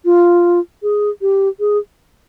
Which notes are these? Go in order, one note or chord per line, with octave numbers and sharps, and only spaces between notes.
F4
G#4
G4
G#4